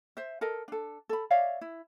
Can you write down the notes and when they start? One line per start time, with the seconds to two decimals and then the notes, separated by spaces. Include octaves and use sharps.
0.17 C5 E5
0.41 A4 A#4 D#5
0.68 D4 A4
1.09 A4 B5
1.31 C#5 D5 E5 F5
1.61 E4